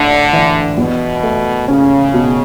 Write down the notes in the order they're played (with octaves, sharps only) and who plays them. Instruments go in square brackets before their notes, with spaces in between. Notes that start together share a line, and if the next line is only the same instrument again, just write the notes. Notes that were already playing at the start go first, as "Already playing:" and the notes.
Already playing: [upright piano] A2 D4 [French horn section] D3
[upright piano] E3
[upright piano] E2 [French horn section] B2
[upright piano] A3
[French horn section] C#3 [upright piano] C#4
[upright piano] B2